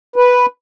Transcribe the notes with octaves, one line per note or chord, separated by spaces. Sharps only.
B4